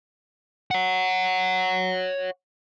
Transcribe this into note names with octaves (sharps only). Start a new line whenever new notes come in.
C#5 F#5